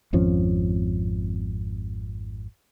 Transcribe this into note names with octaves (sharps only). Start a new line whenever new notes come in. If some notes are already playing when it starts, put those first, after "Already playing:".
G#1 F2 F3 C#4